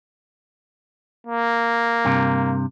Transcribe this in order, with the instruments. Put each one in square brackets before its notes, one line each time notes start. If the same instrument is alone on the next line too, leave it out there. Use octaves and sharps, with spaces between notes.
[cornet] A#3
[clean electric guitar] G2 C3